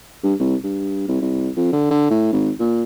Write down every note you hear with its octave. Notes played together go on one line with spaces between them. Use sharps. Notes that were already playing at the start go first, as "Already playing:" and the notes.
G2
C2
G2
C2
C2
F2
D3
D3
A2
G#1
A#2